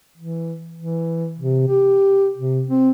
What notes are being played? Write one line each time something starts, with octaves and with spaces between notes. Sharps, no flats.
E3
E3
C3
G4
C3
C4